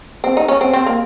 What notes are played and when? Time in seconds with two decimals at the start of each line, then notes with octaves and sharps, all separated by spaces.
0.24 C4
0.37 D#4
0.48 C#4
0.61 C4
0.73 C4
0.86 A#3